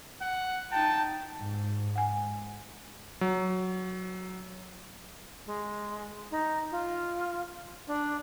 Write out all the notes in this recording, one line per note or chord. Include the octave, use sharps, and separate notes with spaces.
F#5
D#4 G5 A5
G#2
F#5 G#5
F#3
G#3
D#4
F4
D4